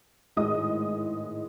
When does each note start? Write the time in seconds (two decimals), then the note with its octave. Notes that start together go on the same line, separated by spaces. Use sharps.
0.37 G#1 A2 G#3 D#5 D#6